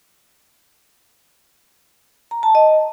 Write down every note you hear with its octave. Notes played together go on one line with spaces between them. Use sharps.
A#5
A5
D#5